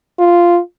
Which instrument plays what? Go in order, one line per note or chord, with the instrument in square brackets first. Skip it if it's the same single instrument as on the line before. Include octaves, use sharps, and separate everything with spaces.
[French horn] F4